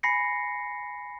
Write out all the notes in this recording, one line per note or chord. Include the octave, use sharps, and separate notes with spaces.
G#5 B5 A#6 C7 C#7